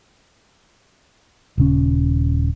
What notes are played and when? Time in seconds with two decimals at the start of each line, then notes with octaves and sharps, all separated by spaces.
1.58 D#1 C#3 C#4